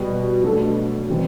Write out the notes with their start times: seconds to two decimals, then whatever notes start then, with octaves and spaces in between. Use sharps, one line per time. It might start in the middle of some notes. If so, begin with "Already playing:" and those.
Already playing: B2 G3 B3
0.44 B1 B2 A3 D4 A4
1.10 E3 G3 C4